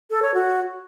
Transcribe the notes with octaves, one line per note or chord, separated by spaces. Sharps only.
A4
C#5
F#4